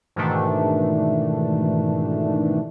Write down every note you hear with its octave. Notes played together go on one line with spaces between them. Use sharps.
G#2 B2 D#3 E3 A3 D4